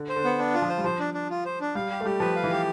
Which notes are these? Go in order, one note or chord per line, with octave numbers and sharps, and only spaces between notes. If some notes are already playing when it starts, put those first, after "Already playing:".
Already playing: D3
C5
D3
B3
D4
F4
F3
C5
G3
F3 C5
D4
D4
F4
C5
D4
G3 F5
G4
A3
G3 G4
F3 B4
F5
E3
G4